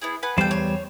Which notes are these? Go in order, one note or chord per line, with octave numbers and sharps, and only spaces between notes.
B3 E4 G#4
B4 F#5 G#5
E2 G3 A4 C5 F5 G5
C#5